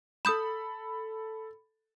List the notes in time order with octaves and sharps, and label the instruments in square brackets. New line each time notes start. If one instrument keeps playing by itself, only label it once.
[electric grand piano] A4 B5 [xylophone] D#6 G6 E7